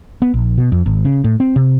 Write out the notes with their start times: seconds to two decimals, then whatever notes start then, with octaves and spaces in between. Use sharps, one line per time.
0.22 B3
0.34 A#1
0.58 B2
0.72 F2
0.86 G#1
1.05 C#3
1.24 A2
1.40 C4
1.56 C3